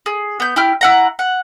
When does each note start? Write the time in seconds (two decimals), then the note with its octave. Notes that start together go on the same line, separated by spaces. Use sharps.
0.06 G#4
0.40 B3 G6
0.56 E4 G4 F6
0.81 E4 F#5 A#5
1.19 F#5